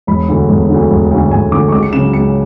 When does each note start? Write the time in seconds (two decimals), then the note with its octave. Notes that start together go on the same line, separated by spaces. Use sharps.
0.07 E1 B5
0.29 D2 D3
0.49 E1
0.69 D2 D3
0.90 E1
1.11 D2 D3
1.31 E1 G#5
1.51 D2 D3 D6
1.69 C#6
1.72 C#2 D6
1.83 C#7
1.93 C#3 F#3 E7
2.13 C#2 C#7